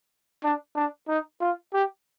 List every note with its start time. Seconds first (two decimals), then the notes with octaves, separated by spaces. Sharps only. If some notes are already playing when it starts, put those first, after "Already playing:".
0.44 D4
0.76 D4
1.09 D#4
1.41 F4
1.74 G4